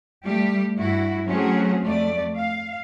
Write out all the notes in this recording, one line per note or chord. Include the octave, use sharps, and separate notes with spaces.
G3 A3 G4
G2 E4 F#4
F#3 A3 C4 C#4 F#4 G#4
F2 A3 D5
F5